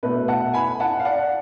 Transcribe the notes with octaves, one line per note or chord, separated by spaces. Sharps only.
B2 A3 B4
F#5 A5
G#5 B5
F#5 A5
F5
D5 F#5